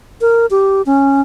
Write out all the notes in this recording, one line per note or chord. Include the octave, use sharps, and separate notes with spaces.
A#4
G4
C#4